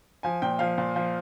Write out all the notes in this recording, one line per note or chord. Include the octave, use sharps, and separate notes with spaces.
F3 G#5
A#2 G5
F3 F5
A#2
F3